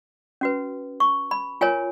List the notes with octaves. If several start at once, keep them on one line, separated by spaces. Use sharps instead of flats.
C#4 F#4 B4
C#6
B5
F4 A#4 C#5 G#5